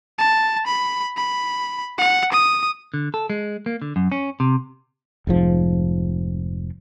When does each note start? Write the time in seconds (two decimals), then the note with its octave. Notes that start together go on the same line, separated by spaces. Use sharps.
0.19 A5
0.67 B5
1.17 B5
1.98 F#5
2.32 D#6
2.94 D3
3.14 A4
3.30 G#3
3.66 A#3
3.82 D3
3.96 F#2
4.12 C#4
4.40 C3
5.27 F1 G#2 F3